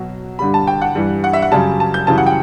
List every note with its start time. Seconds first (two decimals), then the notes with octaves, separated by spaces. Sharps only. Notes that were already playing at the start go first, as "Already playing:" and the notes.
Already playing: B2 F#3
0.39 G2 D3 G3 B5
0.54 A5
0.67 G5
0.82 F#5
0.95 G2 E3 G3
1.24 F#5
1.33 E5
1.42 F#5
1.51 F#2 C#3 G3 A5
1.80 A5
1.94 G6
2.07 F#2 C#3 E3 G3 A5
2.18 F#5
2.27 G5